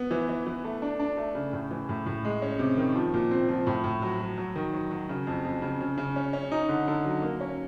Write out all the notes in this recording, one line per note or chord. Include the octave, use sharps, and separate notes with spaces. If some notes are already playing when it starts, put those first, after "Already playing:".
Already playing: B3
E3
E3
E3
A3
D4
D4
A3
C#3
A2
E3
A2
A2
G#3
C#4
C3
D#3
F3
A#2
C4
F3
A2
A2
F#3
F#3
F#3
D#3
F#3
F#3
C#3
F2
F2
C#3
C#3
C#3
C#4
C#4
D#4
D3
D3
F#3
A#3
C#4